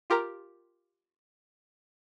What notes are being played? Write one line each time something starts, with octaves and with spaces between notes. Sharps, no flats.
F4 G4 A#4 A#5